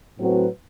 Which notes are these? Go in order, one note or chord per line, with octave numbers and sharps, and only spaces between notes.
A2 F#3 C4 F#4 B4